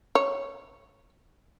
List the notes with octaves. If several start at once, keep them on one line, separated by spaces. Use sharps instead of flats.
C#5